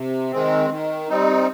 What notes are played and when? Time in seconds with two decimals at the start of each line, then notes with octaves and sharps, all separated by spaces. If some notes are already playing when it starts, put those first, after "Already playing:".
Already playing: C3
0.31 D#3 G#3 C4
0.70 D#3
1.08 G3 C4 D#4